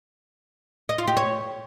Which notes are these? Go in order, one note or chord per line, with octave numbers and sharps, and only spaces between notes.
D#5
F4
G4
C#5